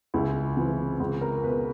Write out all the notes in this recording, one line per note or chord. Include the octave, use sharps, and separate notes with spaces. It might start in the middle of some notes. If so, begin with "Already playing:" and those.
C#2 E4
C3 E3
C#2
A#4
B2 B4